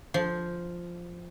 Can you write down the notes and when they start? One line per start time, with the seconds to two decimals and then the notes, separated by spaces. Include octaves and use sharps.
0.14 F3